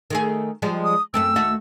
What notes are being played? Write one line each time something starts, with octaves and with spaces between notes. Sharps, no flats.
D#3 A3 G#4
F3 G3 G#3
D#6
F#2 A3 C4 E6
D#2 A3 F#4